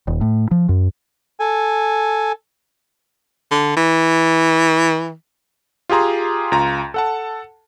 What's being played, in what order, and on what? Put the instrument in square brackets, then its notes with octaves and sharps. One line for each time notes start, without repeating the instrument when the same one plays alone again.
[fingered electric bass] D#1
A2
F3
F#2
[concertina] A4 G#5
[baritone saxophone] D3
E3
[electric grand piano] F4 G4 G#4 A#5 C6
C#2 F4 A#5
A4 F#5 A5